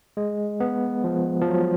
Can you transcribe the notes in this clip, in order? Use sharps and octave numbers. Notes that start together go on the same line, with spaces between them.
G#3
B3
F3
F3
F#3